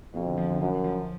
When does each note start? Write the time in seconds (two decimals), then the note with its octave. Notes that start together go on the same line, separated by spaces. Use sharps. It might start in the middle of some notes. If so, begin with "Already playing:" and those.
0.14 F2 B2
0.26 D3
0.38 F3
0.49 D3
0.61 F#2 F3
0.84 F3